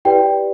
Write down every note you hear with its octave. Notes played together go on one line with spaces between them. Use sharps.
E4 G4 B4 D5 G5